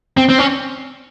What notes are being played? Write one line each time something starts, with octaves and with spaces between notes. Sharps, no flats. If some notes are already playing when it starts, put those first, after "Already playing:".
C4
C4
C#4